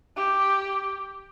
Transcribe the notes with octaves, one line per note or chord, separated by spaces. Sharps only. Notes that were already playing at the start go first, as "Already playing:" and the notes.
G4